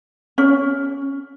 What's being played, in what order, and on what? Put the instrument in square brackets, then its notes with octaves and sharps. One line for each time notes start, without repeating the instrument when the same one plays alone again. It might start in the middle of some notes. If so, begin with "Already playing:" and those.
[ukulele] C#4